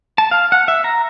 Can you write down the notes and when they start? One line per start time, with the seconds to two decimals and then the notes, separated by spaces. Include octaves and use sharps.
0.18 A5
0.31 F5
0.52 F#5
0.68 E5
0.84 A#5